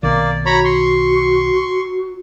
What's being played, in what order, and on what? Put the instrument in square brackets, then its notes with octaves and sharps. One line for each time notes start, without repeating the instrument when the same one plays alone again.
[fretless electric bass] B1 D#3 [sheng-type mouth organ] A#3 D5
[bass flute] F#4 [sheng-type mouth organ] C#5 A#5 B5
[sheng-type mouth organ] C6 C#6